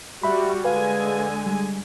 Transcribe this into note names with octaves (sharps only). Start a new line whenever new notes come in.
G3 F#4 E5 B5
D3 G#3 B4 F5 G#5
G3